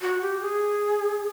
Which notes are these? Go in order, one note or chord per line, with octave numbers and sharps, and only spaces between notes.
F#4
G4
G#4